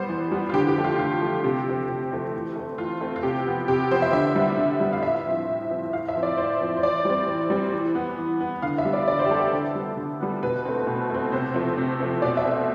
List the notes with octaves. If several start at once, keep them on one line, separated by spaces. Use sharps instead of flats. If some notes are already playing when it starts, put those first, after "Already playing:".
Already playing: G3 B3 C5
E3
G3 B3
F4
D3 G4
G4
F3 A3
F4
D3 F4
F3 A3
C3 G4
F3 A3 C4
C3
F3 A3 C4
E3
A3 C4
E3 F4
A3 C4
F4
C3 G4
F3 B3
C3 G4
F3 B3 C5
E5
D3 E5
G3 B3
D3
G3 B3
F5
A2 E5
F3 C4
A2
F3 C4
A2 F5
E5
F3 C4
D5
A2 C5
F3 C4
C5
E3 D5
G3 C4
E3
G3 C4
E3
B3
E3
B3
D3 F5
E5
G3 B3
D5
D3 D5
C5
G4
G3 B3 A4
A4
D3
G3 B3
D3
G3 B3
B2 B4
A3 C4
B2
A3 C4
C3 C5
F3 A3 C4
C3
F3 A3 C4
B2 D5
E5
A3 C4
E5